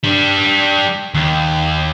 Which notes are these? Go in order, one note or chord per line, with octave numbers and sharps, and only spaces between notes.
G3 D4
D#2